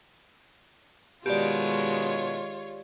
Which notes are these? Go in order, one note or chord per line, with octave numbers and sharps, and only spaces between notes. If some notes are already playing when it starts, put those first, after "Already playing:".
B2 D#3 G#3 F4 G4 C#5 D5